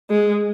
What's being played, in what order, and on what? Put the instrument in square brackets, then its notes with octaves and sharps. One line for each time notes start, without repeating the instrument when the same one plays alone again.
[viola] G#3